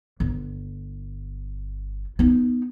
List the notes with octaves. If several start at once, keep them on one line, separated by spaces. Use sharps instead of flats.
G1
B3 D#4